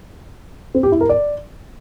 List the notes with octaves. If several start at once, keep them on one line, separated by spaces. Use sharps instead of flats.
C4
G4
E4
A#4
D5